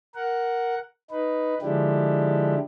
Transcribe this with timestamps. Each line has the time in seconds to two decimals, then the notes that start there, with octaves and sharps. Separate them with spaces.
0.15 A#4 F#5
1.11 D#4 B4
1.62 D3 F3 G#3 D4 E4 G4